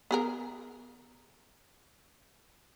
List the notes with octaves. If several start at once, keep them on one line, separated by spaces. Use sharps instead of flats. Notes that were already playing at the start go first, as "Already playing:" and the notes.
B3 G#4 A#4